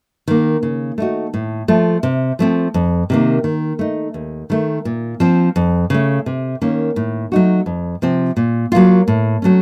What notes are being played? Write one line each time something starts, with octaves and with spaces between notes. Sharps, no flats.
D#3 A#3
C#3
A3 D#4 F#4
A2
F3 A3
C3
F3 A3 C4
F2
C3 D#3 A#3
D#3
A3 D#4
D#2
D#3 A3
A#2
F3 C4
F2
C#3 A3
C3
D#3 A#3 C#4
A2
F#3 A3 D#4 F#4
F2
C3 F3 C4
A#2
F#3 A#3 F4
A2
F#3 A3 C#4